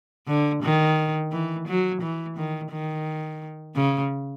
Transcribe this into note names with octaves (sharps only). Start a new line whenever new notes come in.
D3
D#3
E3
F#3
E3
D#3
D#3
C#3